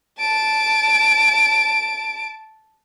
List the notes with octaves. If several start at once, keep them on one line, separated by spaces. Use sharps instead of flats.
A5 D7